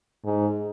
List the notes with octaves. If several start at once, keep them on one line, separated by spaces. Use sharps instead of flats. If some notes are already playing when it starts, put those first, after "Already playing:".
G#2